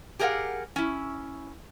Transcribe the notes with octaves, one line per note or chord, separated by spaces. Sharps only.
G4 G#4 A#4 D#5 F5 F#5
C#4 E4